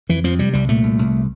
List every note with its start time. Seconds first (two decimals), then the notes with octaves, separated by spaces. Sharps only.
0.09 F2 E3
0.24 F2 F3
0.39 C3 G3
0.53 C2 G3
0.68 A#2 A3
0.84 C2
0.99 C2